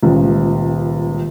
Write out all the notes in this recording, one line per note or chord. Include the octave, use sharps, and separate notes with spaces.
D#1 C#2